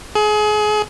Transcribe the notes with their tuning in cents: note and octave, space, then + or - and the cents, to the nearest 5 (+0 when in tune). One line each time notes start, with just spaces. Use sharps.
G#4 +30